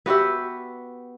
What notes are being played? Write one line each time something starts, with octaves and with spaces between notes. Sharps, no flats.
B3 F#4 G4 E5